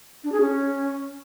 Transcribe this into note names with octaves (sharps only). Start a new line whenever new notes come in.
D4
G#4
C#4